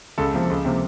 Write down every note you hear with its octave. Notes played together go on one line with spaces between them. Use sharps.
C#2 A4
C3 F3 A#3
C#2
C3 F3 A#3